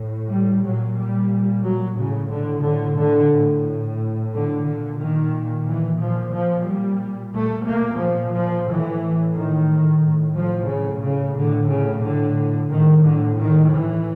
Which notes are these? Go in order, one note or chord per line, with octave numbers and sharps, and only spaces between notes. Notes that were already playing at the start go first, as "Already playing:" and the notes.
Already playing: A2
G3
A#2 F#3
G3
F#3
A2 C#3
D3
D3
D3
A2
D3
A#2 D3
D#3
E3
A#2 F3
F3
G3
A#2 A3
A#3
F3
F3
A2 E3
D#3
A2
F3
C#3
C#3
A2 D3
C#3
D3
A2 D#3
D3
D#3
E3